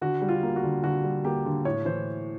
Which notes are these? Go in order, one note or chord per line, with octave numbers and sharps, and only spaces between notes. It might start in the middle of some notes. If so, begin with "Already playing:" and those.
D3 F#4
G3
F4
A#3
F#4
D3
D3 F#4
G3
A#3 G4
D3
A2 C#5
E3 C5